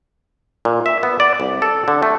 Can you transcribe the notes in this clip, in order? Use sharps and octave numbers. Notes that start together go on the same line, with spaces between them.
A#2
E5
B3
D5
C2
A4
D3
A3